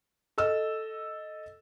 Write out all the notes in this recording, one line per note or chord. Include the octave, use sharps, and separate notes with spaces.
A4 D#5 E6